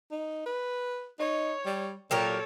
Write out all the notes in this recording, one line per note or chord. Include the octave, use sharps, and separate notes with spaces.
D#4
B4
D#4 C#5
G3
A#2 F#3 G4 A4 A#4 C#5